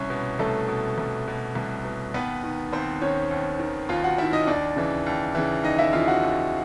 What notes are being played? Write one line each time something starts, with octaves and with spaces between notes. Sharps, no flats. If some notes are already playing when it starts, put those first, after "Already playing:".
Already playing: C2 C#4 C#5
B2
C2 A3 A4
B2
C2
B2
C2
B2
D#2 B3 B4
D#3
D#2 C4 C5
D#3 C#4 C#5
D#2
D#3
D#2 F4 F5
F#4 F#5
D#3 E4 E5
D#4 D#5
D#2 D4 D5
C#3 E3
D#2
C#3 E3
D#2 D#4 D#5
E4 E5
C#3 E3 F4 F5
F#4 F#5
D#2